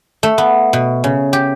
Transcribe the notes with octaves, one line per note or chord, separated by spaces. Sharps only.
A3
B3
B2
C#3
G4